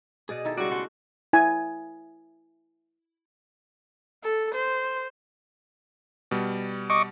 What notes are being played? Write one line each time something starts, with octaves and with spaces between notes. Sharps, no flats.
B2 G#4 D5 D#5
D#3 E4 A4
C#3 G3 G#3 E4 F#4 D5
A3 D5 F#5 C6
E4 G#5
A4
C5
B2 G3
D#5 C#6 D6